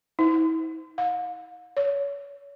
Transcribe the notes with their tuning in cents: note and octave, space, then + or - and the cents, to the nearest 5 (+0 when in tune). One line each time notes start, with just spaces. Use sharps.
E4 -40
F5 +45
C#5 +30